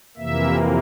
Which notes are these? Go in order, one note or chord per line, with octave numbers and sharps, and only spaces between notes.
F2 C3 E3 A#3 E5